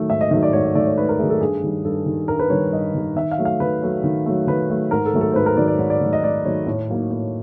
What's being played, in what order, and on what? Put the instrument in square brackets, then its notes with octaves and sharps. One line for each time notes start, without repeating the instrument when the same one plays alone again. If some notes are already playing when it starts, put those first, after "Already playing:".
Already playing: [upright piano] D#3 F#3 A3
G#2 E5
D#5
D#3 F#3 A3 D#5
D5
G#2 C#5
D5
D#3 F#3 A3 D5
C#5
G#2 B4
A#4
D#3 F#3 A3 G#4
A4
G2 G#4
D#3 G3
G2 A4
D#3 G3
G2 A#4
B4
D#3 G3 C#5
G2 D#5
D#3 G3
D#3 E5
F5
F#3 A3
F5
D#3 B4
F#3 A3
D#3
F#3 A3
D#3 B4
F#3 A3
G#2 A#4
A4
D#3 F#3 A3
A4
C5
G#2 B4
A#4
D#3 F#3 A3 D5
D5
G#2 C#5
D5
D#3 F#3 A3
D#5
G#2 D5
D#3 F#3 A3 C#5
A2
F#3 A#3 D#4
A2